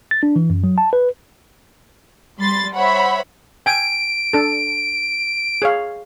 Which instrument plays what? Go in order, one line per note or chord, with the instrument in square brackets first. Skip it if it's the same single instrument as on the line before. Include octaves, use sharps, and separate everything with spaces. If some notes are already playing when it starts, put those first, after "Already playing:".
[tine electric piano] A6
D4
E3
F#2
F#3
A5
B4
[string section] G3 B5 C6 A6
C5 C#5 E5 F#5 B5
[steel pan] G5 G#5 [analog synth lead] D7
[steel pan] D4 A4
G#4 C#5 F5